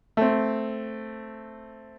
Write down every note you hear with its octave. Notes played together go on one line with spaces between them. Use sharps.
A3 C4